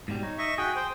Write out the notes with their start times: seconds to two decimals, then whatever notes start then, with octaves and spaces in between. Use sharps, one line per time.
0.08 G#2 B2 G3
0.23 D#4 C#5
0.38 D#5 E5 C#6
0.58 F#4 G#4 G5
0.76 C5 G5